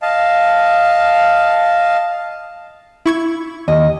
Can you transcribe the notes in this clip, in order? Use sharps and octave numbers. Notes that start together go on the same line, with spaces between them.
D#5 F5 A5
E4 C#6 G#6
D#2 D#5